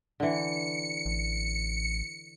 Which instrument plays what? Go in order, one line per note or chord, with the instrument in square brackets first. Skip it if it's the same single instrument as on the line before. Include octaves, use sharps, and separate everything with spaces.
[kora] D3 E3 [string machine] C#7
[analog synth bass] A1